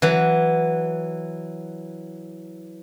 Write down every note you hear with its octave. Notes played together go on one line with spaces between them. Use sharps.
E3 F#3